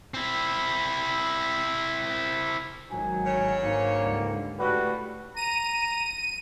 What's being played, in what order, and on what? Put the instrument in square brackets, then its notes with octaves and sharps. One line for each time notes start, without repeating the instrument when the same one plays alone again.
[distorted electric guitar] C4 E4
[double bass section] G#1 D#3 F#3 [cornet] G#5
[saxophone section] D2 C#3 C#5
[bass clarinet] G#2 [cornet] A#3
[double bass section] C#2 D3 G3
[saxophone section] A2 G3 [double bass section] A3 [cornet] F#4 [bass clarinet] B4
[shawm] A#5 [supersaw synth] D#7